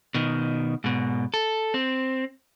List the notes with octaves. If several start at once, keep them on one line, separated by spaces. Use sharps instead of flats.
B2 D#3
G#2 B2
A4
C4